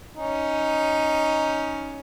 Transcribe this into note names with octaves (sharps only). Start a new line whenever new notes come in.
C#4 D#4